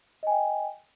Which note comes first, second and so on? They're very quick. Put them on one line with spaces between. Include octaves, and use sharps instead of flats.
D#5 G#5 G5